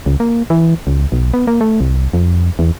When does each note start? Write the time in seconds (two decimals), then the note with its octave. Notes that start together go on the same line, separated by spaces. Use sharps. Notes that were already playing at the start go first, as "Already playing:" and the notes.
0.06 C#2
0.20 A#3
0.50 E3
0.87 C#2
1.12 B1
1.34 B3
1.47 A#3
1.61 A3
1.81 C2
2.13 F2
2.59 E2